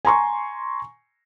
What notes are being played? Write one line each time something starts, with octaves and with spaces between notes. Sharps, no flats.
G#5 A#5 C6 C#6